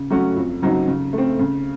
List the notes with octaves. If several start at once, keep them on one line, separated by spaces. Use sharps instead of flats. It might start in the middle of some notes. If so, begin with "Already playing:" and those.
Already playing: C#3
F#3 A3 C#4 F#4
F2
C#3 F#3 C4 D#4
C#3
A3
C4
C#3